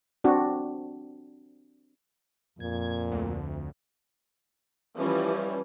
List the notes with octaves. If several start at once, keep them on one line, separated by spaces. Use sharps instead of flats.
C4 D4 F#4
F2 A#2 G#6
D2
E3 F3 G3 C#4